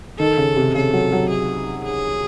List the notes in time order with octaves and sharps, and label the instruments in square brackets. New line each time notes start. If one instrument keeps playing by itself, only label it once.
[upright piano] D#3 [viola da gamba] A4
[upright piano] C#3
C3
[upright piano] C#3 [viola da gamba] A4
[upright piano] F#3
F#3
[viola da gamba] G#4
G#4